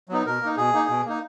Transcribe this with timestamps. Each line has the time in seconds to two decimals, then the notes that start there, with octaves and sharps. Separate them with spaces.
0.09 F#3 B3 D#4
0.26 B2 A#4
0.41 A#3 D#4
0.57 B2 G#4
0.73 A#3 D#4
0.89 B2
1.05 A#3 D#4